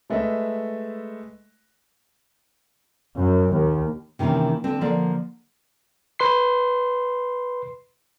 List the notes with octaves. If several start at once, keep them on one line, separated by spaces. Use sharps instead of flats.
G#3 A3 B4 D#5 E5
F#2
D#2
C3 D#3 E3 A#3 C#4
D3 C4
D3 F3 A#3 D5
B4 C6 C7